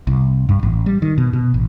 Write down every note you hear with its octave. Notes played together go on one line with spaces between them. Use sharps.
C2
G2
A1
G3
D#3
B2
B2
A1